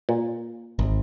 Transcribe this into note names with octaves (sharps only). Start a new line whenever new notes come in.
A#2
G#1